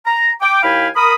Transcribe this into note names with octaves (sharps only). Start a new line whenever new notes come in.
A#5
G5 D6
D#2 E4 F5 G5 G#5 B5
A#4 B5 D#6